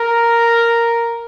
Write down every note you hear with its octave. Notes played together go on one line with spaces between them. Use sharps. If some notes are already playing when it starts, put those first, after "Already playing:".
Already playing: A#4